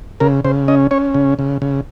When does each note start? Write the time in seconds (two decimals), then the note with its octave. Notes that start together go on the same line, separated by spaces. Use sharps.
0.20 C#3 A#4
0.44 C#3 C5
0.68 C#4 D#5
0.91 C#4 C#5
1.14 C#3
1.39 C#3
1.62 C#3